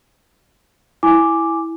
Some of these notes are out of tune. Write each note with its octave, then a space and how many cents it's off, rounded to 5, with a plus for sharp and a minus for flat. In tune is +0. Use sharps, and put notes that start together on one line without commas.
E4 +0 G#5 +0 D6 +0